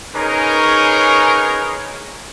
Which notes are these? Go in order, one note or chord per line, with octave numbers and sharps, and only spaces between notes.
C#4 D#4 G#4 A#4 B4 C#5